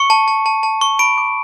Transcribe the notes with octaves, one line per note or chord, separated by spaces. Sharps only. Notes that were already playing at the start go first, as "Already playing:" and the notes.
Already playing: C#6 C#7
A5
A5
A5
A5
C#6
B5 D7
D6